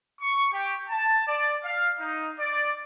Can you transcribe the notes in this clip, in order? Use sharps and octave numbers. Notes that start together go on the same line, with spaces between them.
C#6
G4
A5
D5
F5
D#4
D5